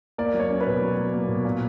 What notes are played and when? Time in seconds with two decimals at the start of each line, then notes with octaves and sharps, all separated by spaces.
0.18 A#3 D5
0.34 F#3
0.40 C#5
0.50 C#4
0.61 B4
0.66 B2
0.82 F#3
0.97 F#3
1.14 A#3
1.29 B2
1.45 A#2